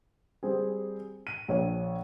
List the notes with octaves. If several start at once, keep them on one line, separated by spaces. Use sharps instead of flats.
G3 C4 G#4
D#7
A#1 C#5